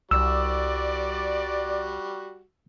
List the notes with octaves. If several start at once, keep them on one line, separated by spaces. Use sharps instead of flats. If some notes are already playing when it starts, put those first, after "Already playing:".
C2 G3 F#4 D5 E6